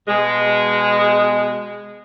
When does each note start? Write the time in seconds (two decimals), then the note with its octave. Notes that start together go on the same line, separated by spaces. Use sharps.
0.08 B2 G#3